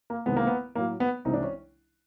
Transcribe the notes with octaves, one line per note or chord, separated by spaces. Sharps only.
A#3
C2 C3 D#3 G#3 B3
A#3
B3
A2 F#3 A#3
B3
C2 C3 E3 G#3 D#4
D4
C#4